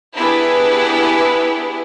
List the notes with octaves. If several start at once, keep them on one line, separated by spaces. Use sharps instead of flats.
B3 D4 E4 G4 G#4 B4